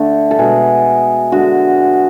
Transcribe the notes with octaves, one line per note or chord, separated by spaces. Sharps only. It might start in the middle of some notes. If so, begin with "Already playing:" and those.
Already playing: D3 A3 A4
A4
B2 G#3 G#4
D3 G#3 F#4